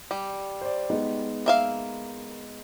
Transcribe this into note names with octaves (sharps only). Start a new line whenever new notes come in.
G3
C5 D5
G#3 B3 D#4
A#3 E5 F5